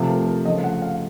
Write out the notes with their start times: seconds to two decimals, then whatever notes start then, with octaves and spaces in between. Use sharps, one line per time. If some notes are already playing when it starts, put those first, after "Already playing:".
Already playing: C3 F3 A3
0.09 A#4
0.27 A#4
0.45 C#3 F3 A3 D#5
0.64 F#5
0.82 F5